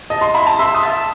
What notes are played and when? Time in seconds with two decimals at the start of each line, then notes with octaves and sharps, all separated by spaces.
0.10 D#5 A5
0.21 C6
0.34 E4 B5
0.47 A5
0.59 E5 C6
0.75 D#6
0.83 A5